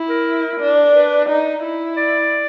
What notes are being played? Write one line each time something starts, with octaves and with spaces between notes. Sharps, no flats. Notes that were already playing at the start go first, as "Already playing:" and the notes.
Already playing: E4
A#4
D4
B4
D#4
E4
D5